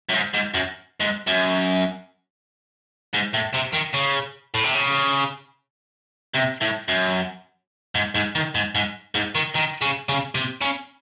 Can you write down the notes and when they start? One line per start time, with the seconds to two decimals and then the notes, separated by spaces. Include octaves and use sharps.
0.09 F#2
0.14 G#2
0.34 G#2
0.54 F#2
1.00 G#2
1.27 F#2
3.14 G#2
3.34 A2
3.54 C3
3.74 D#3
3.94 C#3
4.54 A2
4.64 C3
4.75 C#3
6.34 C3
6.61 A2
6.88 F#2
7.95 G#2
8.15 G#2
8.35 D#3
8.55 G#2
8.75 G#2
9.15 G#2
9.35 D#3
9.55 D#3
9.82 C#3
10.09 C#3
10.35 C3
10.61 C#3